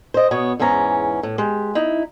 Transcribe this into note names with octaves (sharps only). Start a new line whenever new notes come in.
C5 D#5
B2 B3 C#5
E2 G#2 E3 C#4 A#5
A2
G#3 G4
D#4 E4